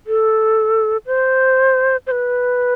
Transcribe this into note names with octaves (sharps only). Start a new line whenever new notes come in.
A4
C5
C5
B4